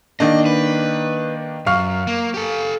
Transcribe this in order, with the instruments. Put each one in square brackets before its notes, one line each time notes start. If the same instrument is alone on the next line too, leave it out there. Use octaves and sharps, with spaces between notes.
[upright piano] D#3 A#3 D4 [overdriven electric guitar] D#5
[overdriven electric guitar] B4
[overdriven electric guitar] F#2 [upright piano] F5 C#6 F6
[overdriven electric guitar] A#3
G4 A4